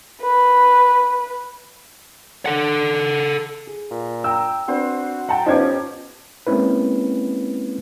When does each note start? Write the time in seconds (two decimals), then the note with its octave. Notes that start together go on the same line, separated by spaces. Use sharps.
0.22 B4
2.46 A4 F#5
3.67 G#4
3.91 A#2
4.24 G5 A#5 E6
4.68 C4 D4 F#4 B4 C5
5.29 F#5 G5 A5 A#5
5.46 F3 B3 C#4 D#4 G4 A5 G#6
6.47 G#3 A#3 C4 C#4 E4 B4